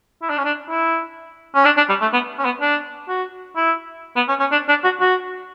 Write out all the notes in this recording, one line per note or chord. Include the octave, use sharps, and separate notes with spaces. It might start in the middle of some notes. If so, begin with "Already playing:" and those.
E4
D4
C#4
D4
E4
C#4
D4
D4
G3
A3
B3
C#4
B3
D4
F#4
E4
B3
C#4
C#4
D4
D4
F#4
F#4